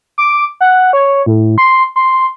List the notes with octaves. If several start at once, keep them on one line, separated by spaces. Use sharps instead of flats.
D6
F#5
C#5
A2
C6
C6